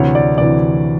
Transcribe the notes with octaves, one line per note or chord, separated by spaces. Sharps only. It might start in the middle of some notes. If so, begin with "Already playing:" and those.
Already playing: D2 C3 E3 C#5
D5
D2 C3 E3 D5